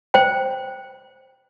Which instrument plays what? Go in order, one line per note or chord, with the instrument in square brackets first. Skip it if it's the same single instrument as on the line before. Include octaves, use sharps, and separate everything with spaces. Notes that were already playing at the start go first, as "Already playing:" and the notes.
[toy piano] C5 G5